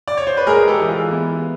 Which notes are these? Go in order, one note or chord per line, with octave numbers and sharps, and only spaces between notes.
D5
C#5
C5
B4
G#3 G#4 A#4
G4 A4
E3
F4
B3 E4